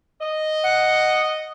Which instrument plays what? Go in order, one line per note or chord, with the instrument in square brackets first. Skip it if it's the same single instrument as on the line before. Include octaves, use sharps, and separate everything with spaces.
[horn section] D#5
[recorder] F#5